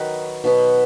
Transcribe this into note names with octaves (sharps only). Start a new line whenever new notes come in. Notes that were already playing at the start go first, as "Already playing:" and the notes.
Already playing: D#3 F#3 D#4 B4
B2 F#3 B3